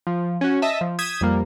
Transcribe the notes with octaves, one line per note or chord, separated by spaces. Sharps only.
F3
C#4 F#4
D#5 E5 A5
F3
D#6 G6 G#6 B6 E7
F2 G3 A#3